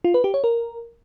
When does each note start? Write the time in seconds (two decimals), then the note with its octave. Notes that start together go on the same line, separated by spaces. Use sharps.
0.04 F4
0.14 B4
0.24 G4
0.34 C#5
0.44 A#4